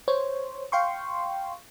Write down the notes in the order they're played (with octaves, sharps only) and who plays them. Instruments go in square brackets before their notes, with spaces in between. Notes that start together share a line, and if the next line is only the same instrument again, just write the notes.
[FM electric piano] C5 C#5
F5 G5 C6 C#6